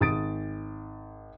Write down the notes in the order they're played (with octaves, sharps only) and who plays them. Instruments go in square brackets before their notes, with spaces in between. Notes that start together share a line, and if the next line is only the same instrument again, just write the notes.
[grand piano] G#1 D#6 A6 D7